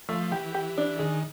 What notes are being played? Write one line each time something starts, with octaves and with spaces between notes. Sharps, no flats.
F3 A3
E3 G4
G4
D4
D#3 G#4